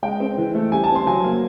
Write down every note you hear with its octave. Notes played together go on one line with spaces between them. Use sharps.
G#3 G5
C4
E3
A3
G3 G#5
A5
C4
C6
F#3 G#5
A#3